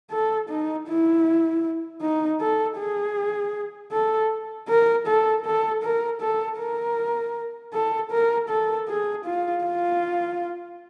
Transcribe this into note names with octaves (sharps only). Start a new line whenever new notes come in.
A4
D#4
E4
D#4
A4
G#4
A4
A#4
A4
A4
A#4
A4
A#4
A4
A#4
A4
G#4
F4
F4